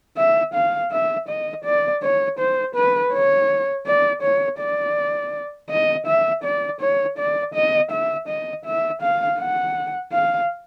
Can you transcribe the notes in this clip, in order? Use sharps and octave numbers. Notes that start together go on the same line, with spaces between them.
E5
F5
E5
D#5
D5
C#5
C5
B4
C#5
D5
C#5
D5
D#5
E5
D5
C#5
D5
D#5
E5
D#5
E5
F5
F#5
F5